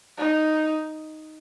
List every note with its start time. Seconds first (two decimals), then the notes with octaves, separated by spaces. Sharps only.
0.18 D#4